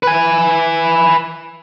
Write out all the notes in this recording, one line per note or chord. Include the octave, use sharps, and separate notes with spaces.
B4 G#5